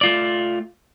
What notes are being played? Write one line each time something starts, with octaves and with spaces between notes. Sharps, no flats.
A3 F4 D5